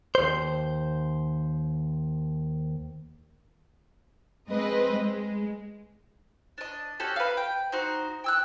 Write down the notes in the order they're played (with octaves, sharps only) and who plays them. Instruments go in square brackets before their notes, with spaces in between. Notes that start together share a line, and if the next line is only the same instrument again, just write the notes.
[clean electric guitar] D#2 C5
[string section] G#3 C4 B4 D#5
G#3
[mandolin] D4 D#5
C#4 F#4 G4 A4
B4 F5
G5
D#4 F#4 C5
G5 E6 F#6